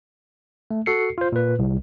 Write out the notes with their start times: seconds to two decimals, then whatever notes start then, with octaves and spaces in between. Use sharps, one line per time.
0.71 A3
0.86 F#4 A4 C7 C#7
1.18 F4 C5
1.32 A#2 B4
1.59 C2